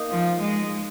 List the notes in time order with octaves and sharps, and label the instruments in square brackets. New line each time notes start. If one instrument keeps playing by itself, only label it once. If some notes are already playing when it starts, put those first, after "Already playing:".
Already playing: [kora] A#3 D#4
[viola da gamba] F3
G#3